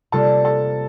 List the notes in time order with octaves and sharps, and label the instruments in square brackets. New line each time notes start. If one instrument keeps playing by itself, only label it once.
[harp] C3 G3 A#3 F4 [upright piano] A4 A5
[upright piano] A4 A5